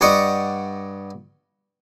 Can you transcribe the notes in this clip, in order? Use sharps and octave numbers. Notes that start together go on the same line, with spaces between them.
G2 D5 D#5 F#5 C#6